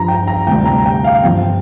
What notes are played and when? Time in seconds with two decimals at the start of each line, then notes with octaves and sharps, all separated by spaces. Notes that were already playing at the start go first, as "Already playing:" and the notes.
Already playing: G2 F3 A#5
0.08 G5
0.27 A#5
0.46 D2 C3 G3 G5
0.65 A#5
0.86 G5
1.04 F5
1.23 G2 D3 F3 G5